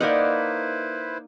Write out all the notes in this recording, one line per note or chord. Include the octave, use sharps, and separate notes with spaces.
A#3 D#4 E4 B4 C5 D5 D#5 F#5